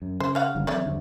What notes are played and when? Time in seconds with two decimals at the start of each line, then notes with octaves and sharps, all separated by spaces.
0.02 F#2
0.20 C#3 C5
0.35 C#4 F5 F#5
0.55 F#1 D3 G3
0.67 E3 F#3 A3 C4 C#5 D5
0.86 E2 G2 D3